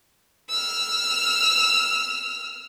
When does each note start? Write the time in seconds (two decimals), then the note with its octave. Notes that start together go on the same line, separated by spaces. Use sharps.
0.49 E6 F6